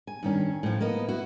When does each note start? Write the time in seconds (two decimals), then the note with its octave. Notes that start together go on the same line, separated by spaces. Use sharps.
0.07 G#5
0.23 G2 D#3 C#4
0.63 A2 F3
0.81 A#3 B3 D#5
1.08 E4 F#4